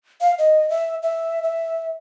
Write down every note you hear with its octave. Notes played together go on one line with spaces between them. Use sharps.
F5
D#5
E5
E5
E5